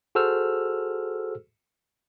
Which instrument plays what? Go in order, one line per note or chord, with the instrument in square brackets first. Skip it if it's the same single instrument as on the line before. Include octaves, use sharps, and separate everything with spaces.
[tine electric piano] F#4 G#4 A4 C5 E6 F6